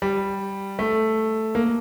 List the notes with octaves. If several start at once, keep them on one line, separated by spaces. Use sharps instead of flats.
G3
A3
A#3